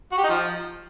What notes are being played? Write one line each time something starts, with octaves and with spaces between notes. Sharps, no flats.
F#4
G4
D#4
F3